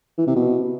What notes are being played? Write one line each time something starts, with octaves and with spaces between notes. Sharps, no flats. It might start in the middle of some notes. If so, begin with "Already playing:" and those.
E3
C3
B2